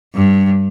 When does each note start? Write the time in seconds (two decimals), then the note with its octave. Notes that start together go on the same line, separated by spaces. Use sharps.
0.15 G2